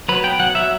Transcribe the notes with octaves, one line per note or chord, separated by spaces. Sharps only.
F#3 B4
B3 G5
F#3 F#5
F#3 E5